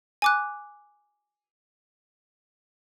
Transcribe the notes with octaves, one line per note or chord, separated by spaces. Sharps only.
G#5 D6 F#6